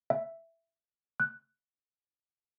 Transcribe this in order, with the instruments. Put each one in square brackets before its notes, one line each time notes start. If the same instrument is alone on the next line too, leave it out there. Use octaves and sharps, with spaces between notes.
[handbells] E5
F#6